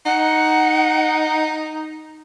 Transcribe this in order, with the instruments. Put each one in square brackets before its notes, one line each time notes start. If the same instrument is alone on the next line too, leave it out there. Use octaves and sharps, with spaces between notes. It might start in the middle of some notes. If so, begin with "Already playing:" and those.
[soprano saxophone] D#4 [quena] F#5